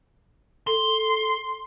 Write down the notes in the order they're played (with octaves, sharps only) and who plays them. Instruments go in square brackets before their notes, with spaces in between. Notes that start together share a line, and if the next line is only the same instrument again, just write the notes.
[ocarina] A4 [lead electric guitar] C6